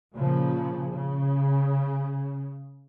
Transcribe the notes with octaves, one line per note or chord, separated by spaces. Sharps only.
A#2 C#3 F3
C#3